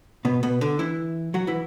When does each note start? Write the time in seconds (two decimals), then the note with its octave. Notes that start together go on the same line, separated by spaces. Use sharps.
0.25 B2 B3
0.43 B2 B3
0.61 D3 D4
0.79 E3 E4
1.34 F#3 F#4
1.47 E3 E4